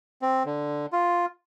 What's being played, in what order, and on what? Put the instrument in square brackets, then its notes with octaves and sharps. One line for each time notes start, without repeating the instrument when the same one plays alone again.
[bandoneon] C4
D3
F4